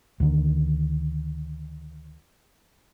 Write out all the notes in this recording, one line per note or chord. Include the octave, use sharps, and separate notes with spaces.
D2 D3 D#3